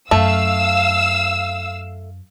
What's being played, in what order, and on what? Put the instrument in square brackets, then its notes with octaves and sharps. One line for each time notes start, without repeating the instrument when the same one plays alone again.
[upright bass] F#2 [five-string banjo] A3 [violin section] F5 E6